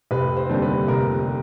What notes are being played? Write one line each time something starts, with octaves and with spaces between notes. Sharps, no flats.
F1 B4
C5
D#2 D3 G3 C4
B4
F1 A#4